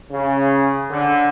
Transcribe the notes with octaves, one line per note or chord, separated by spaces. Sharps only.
C#3
D3